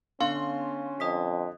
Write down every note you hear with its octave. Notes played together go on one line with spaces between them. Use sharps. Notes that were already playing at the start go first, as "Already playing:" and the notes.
D3 B3 C#4 F5 C6
F2 D#5 D#6 B6